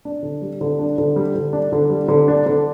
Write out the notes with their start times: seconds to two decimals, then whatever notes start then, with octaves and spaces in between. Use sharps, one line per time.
0.05 D4
0.23 D3
0.42 G3
0.61 D3
0.79 D4
0.98 D3
1.16 G3
1.35 D3
1.53 D4
1.72 D3
1.90 G3
2.08 D3
2.28 D4
2.46 D3